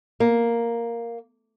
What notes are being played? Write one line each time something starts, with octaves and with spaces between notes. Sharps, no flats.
A#3